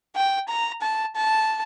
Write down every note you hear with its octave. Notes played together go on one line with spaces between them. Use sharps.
G5
A#5
A5
A5